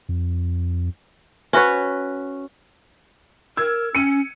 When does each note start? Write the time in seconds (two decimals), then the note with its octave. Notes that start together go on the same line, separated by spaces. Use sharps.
0.09 F2
1.53 C#4 F#4 B4 C#5
3.57 A#4 E6 G#6
3.95 C#4 C#7 D#7